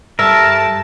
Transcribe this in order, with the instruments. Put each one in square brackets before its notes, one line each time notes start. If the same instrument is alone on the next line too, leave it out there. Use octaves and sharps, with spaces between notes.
[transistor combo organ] G2 [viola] A4 A5 [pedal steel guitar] A#4 [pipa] E5